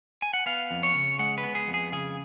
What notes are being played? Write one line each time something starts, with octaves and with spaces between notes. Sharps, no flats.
G#5
F#5
B3 F5
F2
C#5
C#3
G#3 F#5
B4
B3
G#4
F2
G#4
C#3 G#4